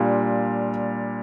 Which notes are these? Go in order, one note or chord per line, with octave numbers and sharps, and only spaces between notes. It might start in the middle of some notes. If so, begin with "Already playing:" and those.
Already playing: A#2 G3 D4 F4